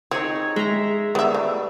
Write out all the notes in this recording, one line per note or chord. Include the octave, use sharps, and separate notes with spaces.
C4 D#4 G#4 C#5
G#3 E5 A#5
G3 B3 E5
A3